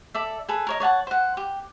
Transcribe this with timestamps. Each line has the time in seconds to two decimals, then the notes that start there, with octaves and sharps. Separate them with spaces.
0.14 A4 D5 E5
0.49 G#4 A4 B4
0.67 A#4 C#5 D#5
0.80 C#5 D5 F#5 A5
1.07 C5 F#5
1.37 G4